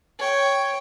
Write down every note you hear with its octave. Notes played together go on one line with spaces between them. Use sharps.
C#5 G5